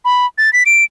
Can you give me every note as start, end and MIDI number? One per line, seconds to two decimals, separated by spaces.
0.05 0.26 83
0.38 0.53 93
0.53 0.63 95
0.66 0.84 98